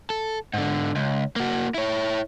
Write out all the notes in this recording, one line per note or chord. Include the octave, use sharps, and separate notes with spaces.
A4
G#2 D3
C#2
A#3 F#4
E4 C#5